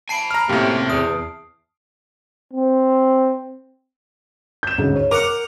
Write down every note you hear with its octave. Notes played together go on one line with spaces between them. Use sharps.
G#5 A5 B5 C7 D7
A#5 F6
F#2 A2 C3 A#3 G4
E2 D#6
C4
G6 E7
D2 G#2 C#3
C#5
A#4 F#5 D6